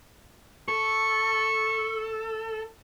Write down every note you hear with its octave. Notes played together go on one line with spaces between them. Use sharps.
A4 C#6